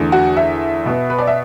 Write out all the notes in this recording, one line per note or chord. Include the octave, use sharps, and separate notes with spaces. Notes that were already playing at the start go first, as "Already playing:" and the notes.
Already playing: E2 D3 A3
F#4
E5
B2 B3
B4
D5
E5